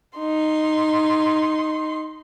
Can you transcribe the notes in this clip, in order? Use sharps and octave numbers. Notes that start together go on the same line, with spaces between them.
D#4 C6